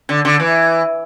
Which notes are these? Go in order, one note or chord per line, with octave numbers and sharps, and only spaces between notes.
D3
D3
E3